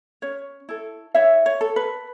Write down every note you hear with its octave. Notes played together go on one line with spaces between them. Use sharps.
C#4 C#5
E4 A4
E4 C#5 E5
C#5
A4
B4